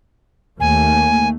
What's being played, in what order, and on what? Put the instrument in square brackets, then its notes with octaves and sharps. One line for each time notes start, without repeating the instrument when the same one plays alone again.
[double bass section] D#2 A3 A#3 [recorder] G#5